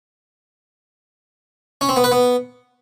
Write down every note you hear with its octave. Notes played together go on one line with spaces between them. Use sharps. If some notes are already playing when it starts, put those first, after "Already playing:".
C#4
C4
B3
B4
B3